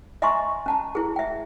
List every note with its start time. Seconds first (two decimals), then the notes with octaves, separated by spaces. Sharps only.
0.22 D#5 E5 G#5 A#5 C6 C#6
0.66 C#4 A5 A#5
0.95 E4 G#4
1.16 E5 G5